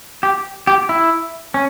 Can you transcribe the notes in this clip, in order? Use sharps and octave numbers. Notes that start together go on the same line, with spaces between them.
G4
G4
E4
C#4